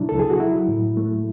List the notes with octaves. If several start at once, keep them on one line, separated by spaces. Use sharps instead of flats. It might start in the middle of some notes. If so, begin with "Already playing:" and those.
Already playing: B2 F#3 D4 E4
C#2 A4
G#4
F#4
F#3 E4
A2
A3